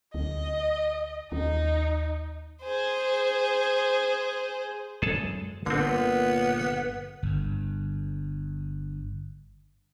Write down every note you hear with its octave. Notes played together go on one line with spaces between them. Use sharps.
D2 D#5
D#2 D#4
G#4 C5
F#2 G#3 G#4 A4 A5
G1 A#2 D3 B3 C4
G1 G2